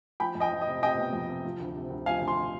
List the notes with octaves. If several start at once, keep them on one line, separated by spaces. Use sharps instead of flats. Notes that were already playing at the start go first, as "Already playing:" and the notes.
F3 G5 B5
F2
D#5 G5
F3
D#5
C3
C3 D#5 G5
B3
F2
C3
F3
D2
C3
D2
F3 F5 G#5
D2
G#5 C6